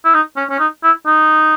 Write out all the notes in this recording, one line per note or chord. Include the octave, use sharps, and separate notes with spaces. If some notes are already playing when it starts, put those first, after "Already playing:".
E4
D#4
C#4
C#4
D#4
E4
D#4